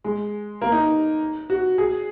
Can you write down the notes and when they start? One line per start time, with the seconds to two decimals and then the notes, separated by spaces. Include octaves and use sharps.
0.04 G#3
0.61 A#3
0.72 D#4
1.50 F#4
1.78 G#4